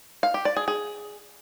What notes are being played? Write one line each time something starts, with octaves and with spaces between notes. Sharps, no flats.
F5
G4
D5
G#4
G#4